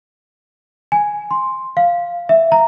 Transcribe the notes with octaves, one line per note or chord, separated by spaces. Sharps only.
G#5
C6
F5
E5
A#5